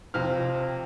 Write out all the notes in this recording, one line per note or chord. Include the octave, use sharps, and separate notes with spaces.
F2 C3 F3 F6